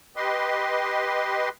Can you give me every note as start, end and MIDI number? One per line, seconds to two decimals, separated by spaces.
0.16 1.49 67
0.16 1.49 71
0.16 1.49 75
0.16 1.49 84